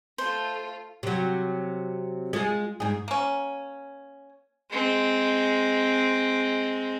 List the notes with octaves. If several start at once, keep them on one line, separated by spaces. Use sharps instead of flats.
A3 F4 C5
C3 F#3
G#3 F4 G#4
G#2 G#4
A#3 C#4
G#3 C4